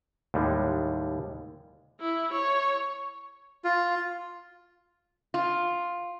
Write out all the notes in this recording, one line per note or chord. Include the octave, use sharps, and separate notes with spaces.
D#2 A2 G3 G#3
E4
C#5
F4
F4